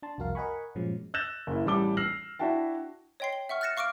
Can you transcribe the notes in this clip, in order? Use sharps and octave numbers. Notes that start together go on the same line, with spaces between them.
D4 A5 C6
C2 F2 F#4 A#4 F5
A#4 D#5 F#5 G#5 B5 C#6
G2 A#2 F3 F#3 G#3 C#4
E6 F#6 G6 A6 A#6 E7
F#1 E4
A1 E3 G3 A5 D6 G7
E6 F6 A#6 C7 F#7
D4 E4 F#4 E5 G5 A5
C#5 D#5 G5 C6 C7
G7
E5 F#5 C#6 F6
F6 F#6 A6 A#6 C#7 E7
F5 C#6 D6 F6 D7